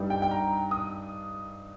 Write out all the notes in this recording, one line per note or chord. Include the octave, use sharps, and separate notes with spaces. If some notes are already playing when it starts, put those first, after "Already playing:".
Already playing: G2 G3 D#4
G5
G5
A#5
D#6